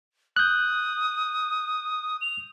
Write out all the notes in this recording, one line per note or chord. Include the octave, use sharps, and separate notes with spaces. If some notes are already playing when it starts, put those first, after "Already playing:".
D#6 F#6 G6
F7